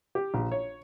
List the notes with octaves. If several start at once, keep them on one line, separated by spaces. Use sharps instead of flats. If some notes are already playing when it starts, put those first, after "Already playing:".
G4
A#1
C#5